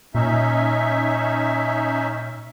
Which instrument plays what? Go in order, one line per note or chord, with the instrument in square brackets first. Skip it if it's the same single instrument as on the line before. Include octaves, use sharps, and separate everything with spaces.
[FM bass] A#2 [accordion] C#4 D#4 E5